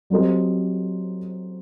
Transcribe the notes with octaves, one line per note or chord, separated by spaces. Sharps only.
F#3 C4 G4 C5 D#5